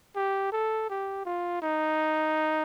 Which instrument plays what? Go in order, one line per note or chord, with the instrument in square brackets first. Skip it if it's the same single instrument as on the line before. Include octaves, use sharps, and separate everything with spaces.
[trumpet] G4
A4
G4
F4
D#4